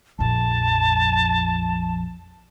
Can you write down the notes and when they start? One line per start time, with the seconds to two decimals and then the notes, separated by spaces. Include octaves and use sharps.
0.19 A#1 F2 A5